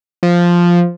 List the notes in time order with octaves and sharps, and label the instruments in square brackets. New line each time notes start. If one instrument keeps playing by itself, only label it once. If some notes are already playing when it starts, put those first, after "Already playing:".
[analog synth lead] F3